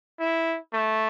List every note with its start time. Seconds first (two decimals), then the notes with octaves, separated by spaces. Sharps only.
0.20 E4
0.73 A3